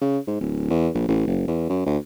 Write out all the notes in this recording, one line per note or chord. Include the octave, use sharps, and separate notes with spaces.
C#3
G#2
D1
E2
A#1
A1
F#1
E2
F#2
D2